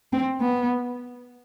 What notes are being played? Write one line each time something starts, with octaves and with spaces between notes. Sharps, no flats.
C4
B3